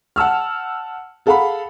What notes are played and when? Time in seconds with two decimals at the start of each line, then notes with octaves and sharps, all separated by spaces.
0.16 F#5 A5 E6 F6
1.26 G#4 A4 F5 F#5 A5 B5